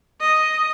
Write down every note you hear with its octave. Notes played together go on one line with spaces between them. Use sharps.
D#5